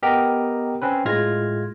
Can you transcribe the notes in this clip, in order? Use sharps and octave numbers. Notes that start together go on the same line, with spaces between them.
B3 G4 A#4 D#5 G5 A#5
C4 C#4 B4
A2 G#3 F4 F6 G#6 A#6